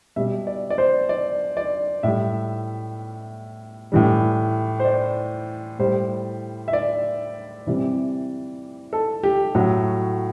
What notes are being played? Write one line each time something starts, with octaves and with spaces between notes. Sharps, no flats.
B2 G3 E5
D5
D5
C5
D5
D5
A2 G3 E5
A2 E3 G3
C5
D5
A2 G3 C5
E5
D5
C3 E3 G3
A4
G4
A2 F#3 F#4